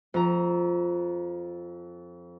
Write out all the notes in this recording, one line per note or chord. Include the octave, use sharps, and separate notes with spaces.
F2 A#5